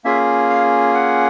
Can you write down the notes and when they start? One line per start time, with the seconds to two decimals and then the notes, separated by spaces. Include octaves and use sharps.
0.04 A#3 C#4 F4 G#4 E5
0.50 F5
0.94 F#5